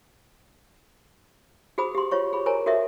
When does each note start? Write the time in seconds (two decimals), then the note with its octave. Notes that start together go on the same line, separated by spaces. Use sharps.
1.78 F#4 G#4 C5 B5 D#6
1.95 G4 C6
2.11 F4 C5 C#5 C#6
2.33 G#4 B5
2.46 A#4 C5 C#5 G#5 A#5
2.66 F#4 A4 A#4 C#5 D#5 E5